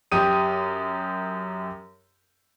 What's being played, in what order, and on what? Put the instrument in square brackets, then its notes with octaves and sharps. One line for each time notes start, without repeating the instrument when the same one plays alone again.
[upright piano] F#2 G4 D#6 D#7